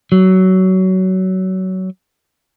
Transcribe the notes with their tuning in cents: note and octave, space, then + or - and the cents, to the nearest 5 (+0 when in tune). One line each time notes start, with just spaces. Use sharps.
F#3 +20